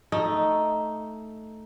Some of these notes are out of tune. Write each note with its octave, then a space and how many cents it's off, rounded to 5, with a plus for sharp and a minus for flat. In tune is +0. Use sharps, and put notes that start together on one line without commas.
A3 +0 D#4 +0